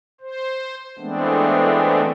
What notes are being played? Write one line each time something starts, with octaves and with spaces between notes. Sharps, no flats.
C5
E3 G#3 A3 B3 C4 D4